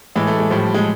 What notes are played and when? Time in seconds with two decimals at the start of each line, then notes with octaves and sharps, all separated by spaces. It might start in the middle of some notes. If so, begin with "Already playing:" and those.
0.16 A2 E3 G#3
0.27 A3
0.39 G#3
0.50 A2 F3 G3
0.63 G3
0.74 G#3